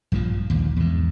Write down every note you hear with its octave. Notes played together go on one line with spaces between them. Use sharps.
A#1 G2 A#2 F3
A#1 D#2
E2 G#2